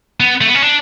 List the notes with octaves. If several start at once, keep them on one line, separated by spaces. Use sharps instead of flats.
B3
A3
B3
C#4
D4